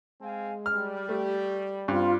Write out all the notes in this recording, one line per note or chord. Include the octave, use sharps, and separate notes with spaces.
G#3 C4 F5 G#5
G3 F6
A3 G4
G2 C4 F4